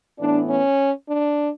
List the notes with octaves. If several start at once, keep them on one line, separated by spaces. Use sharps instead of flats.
A2 E3 B3 D4
C#4
D4